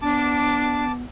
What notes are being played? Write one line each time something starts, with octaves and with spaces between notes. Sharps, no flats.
B3 D4 A5 D6